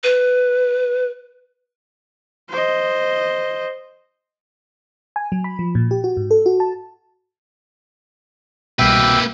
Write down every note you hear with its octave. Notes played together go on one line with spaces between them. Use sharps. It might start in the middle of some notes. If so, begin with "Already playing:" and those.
B4
C5 D#5
G#5
F#3
B5
F3
A#2
G4
F#4
G#2
A4
F#4
A5
C2 B2 A#3 B4 E5 G5